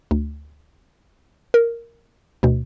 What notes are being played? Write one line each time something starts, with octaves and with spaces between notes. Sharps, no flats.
D2
A#4
D2 B2